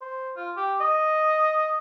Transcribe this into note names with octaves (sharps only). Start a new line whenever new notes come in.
C5
F4
G4
D#5